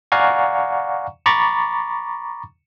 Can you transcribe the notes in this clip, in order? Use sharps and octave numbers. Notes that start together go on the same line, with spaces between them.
D5 F5 F#5 G#5 A#5 C#6
A#5 B5 C#6 D6 A6